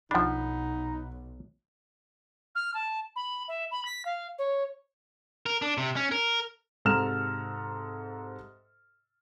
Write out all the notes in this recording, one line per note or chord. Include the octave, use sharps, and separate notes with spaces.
B1 F3 D4 D#4 F#5 B5
F6
A5
B5
E5
B5
B6
F5
C#5
A#4
D4
C3
C#4
A#4
G#2 C3 A4 A#5 F6 E7